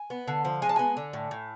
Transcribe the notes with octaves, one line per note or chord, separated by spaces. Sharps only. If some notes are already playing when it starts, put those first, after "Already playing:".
Already playing: G#5
B3
D3
F3
G#3 G#5
A5
B3 G#5
D3
A2
A2